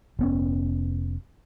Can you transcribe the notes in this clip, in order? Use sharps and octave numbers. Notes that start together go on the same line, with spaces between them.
F1 B3 C#4